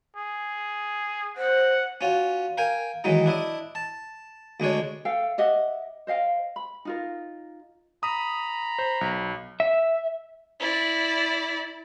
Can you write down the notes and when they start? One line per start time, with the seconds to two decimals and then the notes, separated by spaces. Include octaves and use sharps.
0.16 G#4
1.37 C5 F#5
2.01 C#4 F4 F#4
2.58 A#4 F5 G5 G#5
3.04 D#3 E3 F#3 G#3 D#4
3.26 D4 E4 D#5
3.75 A5
4.60 D2 G#3 D4 C#5
5.05 A4 E5 F5 G5
5.38 G4 D#5 E5 F#5
6.07 C5 D#5 F5 G5
6.56 B5
6.85 D#4 F4 A#4
8.03 A#5 B5 D#6
8.79 C5
9.01 B1
9.60 E5
10.60 E4 D5